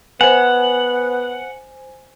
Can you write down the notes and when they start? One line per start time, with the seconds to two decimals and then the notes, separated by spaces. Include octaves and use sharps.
0.21 B3 C5 F#5 G#5